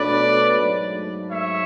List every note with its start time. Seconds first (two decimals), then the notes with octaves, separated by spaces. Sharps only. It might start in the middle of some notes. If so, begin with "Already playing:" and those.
Already playing: B2 A3 D4 A4 B4 C#5 D5
0.57 G#2 F#3 A3
1.29 C#5 E5